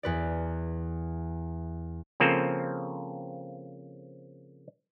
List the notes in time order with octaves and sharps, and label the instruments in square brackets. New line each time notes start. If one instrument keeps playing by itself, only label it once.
[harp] E2 B4 D5
[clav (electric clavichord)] C#3 F3 A#3 C4 A4